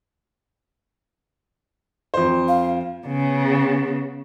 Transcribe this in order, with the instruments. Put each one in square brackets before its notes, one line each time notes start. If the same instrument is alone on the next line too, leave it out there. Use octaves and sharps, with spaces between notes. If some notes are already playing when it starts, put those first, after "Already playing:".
[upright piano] F2 C5
[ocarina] F5
[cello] C#3 B3